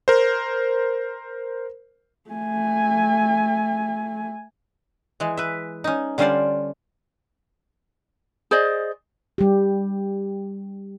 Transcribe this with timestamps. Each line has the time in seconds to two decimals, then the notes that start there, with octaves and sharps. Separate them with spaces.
0.08 A#4 C5
2.30 A3 G#5
5.20 E3 G#3
5.37 B4 E5
5.84 C#4 D#4
6.18 D3 G3 C#4 F4 C5 D5
8.51 G#4 C5 D5 D#5
9.38 G3 G4